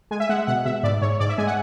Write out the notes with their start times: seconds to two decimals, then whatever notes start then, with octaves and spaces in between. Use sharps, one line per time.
0.11 G#3 G#5
0.20 E5
0.29 G#3 F#5
0.47 B2 F#5
0.65 B2 E5
0.83 G#2 D5
1.02 G#2 C#5
1.20 G#2 D5
1.29 E5
1.38 G#3 G#5
1.47 F#5